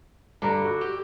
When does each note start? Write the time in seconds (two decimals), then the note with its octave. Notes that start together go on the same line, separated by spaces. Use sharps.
0.42 G2 D3 A#5
0.65 F#4
0.81 G4